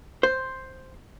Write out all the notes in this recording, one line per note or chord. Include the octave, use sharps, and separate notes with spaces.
C5